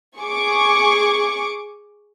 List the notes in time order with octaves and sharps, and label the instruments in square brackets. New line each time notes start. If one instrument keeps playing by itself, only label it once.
[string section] G#4 C#6 D6